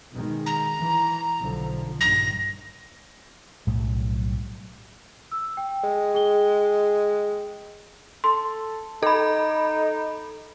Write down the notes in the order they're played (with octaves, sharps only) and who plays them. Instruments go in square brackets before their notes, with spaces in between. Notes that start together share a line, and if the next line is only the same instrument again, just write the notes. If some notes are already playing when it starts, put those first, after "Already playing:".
[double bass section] B2 D#3 G#3
[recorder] A#5
[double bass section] E3
B1 D3 F3
[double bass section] A#1 G2 D#3 [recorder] A#6
[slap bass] B1 A2 F#3 G3
[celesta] E6
G5
[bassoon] G#3
[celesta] G#4 G5 G7
[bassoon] A4 [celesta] C6
[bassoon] D#4 [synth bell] A4 B5